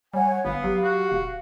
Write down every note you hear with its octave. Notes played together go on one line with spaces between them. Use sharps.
G3 C#5 F#5 G#5
G1 B3 F5
F#3 G4
F#4
D#1